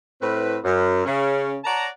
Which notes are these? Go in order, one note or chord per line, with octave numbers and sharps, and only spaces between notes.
A2 C4 B4
F#2
C#3 C#4
C#5 D5 F#5 A5 A#5